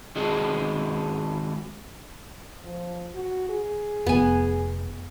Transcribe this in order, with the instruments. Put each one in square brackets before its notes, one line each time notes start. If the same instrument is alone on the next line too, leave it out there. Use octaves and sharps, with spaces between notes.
[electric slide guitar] D#3 G#3 C4 F#4 G#4 A4
[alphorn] F3
F#4
G#4
[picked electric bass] F1 [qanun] B3 G#5